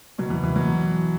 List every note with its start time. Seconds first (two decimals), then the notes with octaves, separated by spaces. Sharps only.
0.18 B2 F#3
0.30 E3
0.44 E3
0.56 B2 F#3